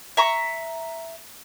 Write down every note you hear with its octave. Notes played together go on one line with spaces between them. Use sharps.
E5 A#5 C#6